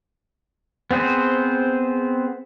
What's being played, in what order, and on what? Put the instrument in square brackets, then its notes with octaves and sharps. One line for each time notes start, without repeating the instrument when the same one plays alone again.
[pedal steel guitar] B3 C4 G#4 C5